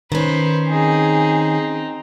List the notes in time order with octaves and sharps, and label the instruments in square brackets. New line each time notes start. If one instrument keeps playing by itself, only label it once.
[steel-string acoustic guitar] D#3 C#4 [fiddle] B4 C5
[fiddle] C4 D#4 [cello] G#4